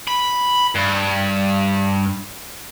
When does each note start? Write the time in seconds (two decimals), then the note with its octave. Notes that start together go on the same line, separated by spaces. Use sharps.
0.08 B5
0.75 G2